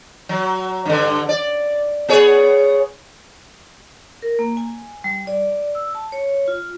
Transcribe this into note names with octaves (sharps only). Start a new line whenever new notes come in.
F#3
G2 D3
D5
B3 G#4 C#5
A#4
A#3
G#5
G3
D5
E6
A5
C#5
F4